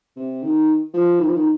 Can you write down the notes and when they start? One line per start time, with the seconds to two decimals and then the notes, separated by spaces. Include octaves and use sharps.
0.16 C3
0.43 D#3
0.93 F3
1.20 D#3
1.26 F3
1.33 D#3